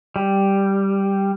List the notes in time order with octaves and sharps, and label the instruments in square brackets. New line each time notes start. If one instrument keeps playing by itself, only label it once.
[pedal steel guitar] G3